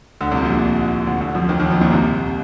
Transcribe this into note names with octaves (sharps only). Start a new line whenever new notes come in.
D2 D3
C2 C3
A#1 A#2
D2 D3
D2 D3
F2 F3
D#2 D#3
D#2 D#3
F2 F3
A#1 A#2
C2 C3